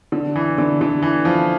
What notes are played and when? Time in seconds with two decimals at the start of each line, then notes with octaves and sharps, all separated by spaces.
0.12 D3
0.36 E3
0.58 D3
0.81 D3
1.02 E3
1.25 F3